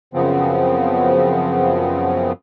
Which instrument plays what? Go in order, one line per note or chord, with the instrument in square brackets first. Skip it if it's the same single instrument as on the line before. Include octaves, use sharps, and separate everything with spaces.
[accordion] F#2 C#3 F3 B3 C4